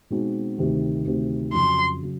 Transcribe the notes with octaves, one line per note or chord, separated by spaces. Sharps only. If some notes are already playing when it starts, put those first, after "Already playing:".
B2 G#3 C4 D#4 F#4
D2 C3 D#3
D2 C3 D#3
F2 C#3 F#3 C6
C#3 F#3